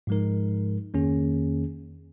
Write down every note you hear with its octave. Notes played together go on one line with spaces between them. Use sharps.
G#2 F3 G#3 D#4 A#4
F2 D#3 A#3 C#4 G#4